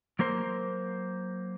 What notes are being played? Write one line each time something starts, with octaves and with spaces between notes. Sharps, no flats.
F#3 A#3 A#4 C5